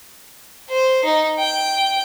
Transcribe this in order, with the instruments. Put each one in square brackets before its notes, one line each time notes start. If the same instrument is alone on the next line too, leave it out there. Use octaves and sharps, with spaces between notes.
[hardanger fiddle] C5
D#4
G5